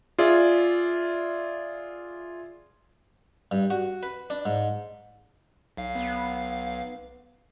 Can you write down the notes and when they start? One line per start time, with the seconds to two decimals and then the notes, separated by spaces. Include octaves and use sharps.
0.19 F4 G#4 D5 E5
3.51 G2
3.70 F#4
4.03 B4
4.30 D4
4.45 G#2
5.77 B1 F5
5.95 B3